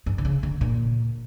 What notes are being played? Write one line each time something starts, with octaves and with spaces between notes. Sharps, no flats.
G2
D3
C#3
D3
A#2